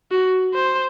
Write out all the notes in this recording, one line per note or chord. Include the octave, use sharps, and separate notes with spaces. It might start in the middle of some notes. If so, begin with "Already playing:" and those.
F#4
C5